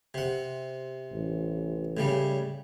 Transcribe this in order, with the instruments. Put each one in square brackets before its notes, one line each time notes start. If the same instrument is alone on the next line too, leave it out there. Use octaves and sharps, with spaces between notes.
[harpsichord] C3 F#5
[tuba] A1
[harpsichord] A2 C#3 G3